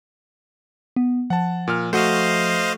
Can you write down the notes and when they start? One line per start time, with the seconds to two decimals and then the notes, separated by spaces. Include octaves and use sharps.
0.96 B3
1.30 F3 F#5 A5
1.68 A#2 F6
1.93 A3 F#4 C5 D#5 F5